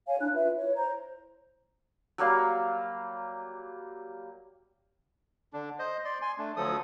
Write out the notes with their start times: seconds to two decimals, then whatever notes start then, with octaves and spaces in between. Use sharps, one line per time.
0.07 C#5 F5 G#5
0.20 D4 E4 F#6
0.34 F4 B4 E5
0.56 E4 C#5
0.75 C5 A#5
2.18 F#3 G3 A#3 F5
5.53 D3 D4
5.79 C5 D#5
6.05 D5 C6
6.22 G#5 C6
6.38 A3 D4
6.56 D2 F3 F#3 A4 D#6